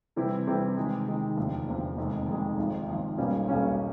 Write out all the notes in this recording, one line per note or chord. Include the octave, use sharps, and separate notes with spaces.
C3 E3 G3 C4 E4
C3 E3 G3 C4 E4
C3 D#3 G#3
C3 D#3 G#3
E1 D2 C3 F3
E1 D2 C3 F3
F1 F2 C3 D#3 G#3
F1 F2 C3 D#3 G#3
G#1 G#2 F3
G#1 G#2 F3
B1 B2 G3 A#3 C#4
B1 B2 G3 A#3 C#4